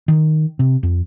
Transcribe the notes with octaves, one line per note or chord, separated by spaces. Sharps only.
D#3
C3
F2